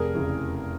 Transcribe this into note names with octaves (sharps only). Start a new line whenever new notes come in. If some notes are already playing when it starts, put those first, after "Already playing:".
Already playing: F1 G#4 A#4
E2 C#3 E3